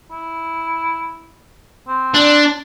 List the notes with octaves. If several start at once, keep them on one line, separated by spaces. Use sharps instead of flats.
E4
C4
D4